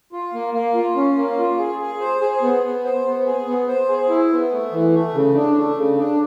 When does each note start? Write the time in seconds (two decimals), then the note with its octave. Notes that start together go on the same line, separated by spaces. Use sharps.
0.13 F4
0.34 A#3
0.54 A#3
0.75 F4
0.96 C#4
1.16 A#3
1.38 F4
1.59 G#4
1.80 G#4
2.01 C5
2.21 G#4
2.42 B3
2.63 B3
2.84 C5
3.05 B3
3.26 G#4
3.46 B3
3.68 C5
3.89 G#4
4.09 E4
4.31 B3
4.52 A3
4.72 E3
4.94 A3
5.14 C#3
5.35 D4
5.56 A3
5.77 C#3
5.98 D4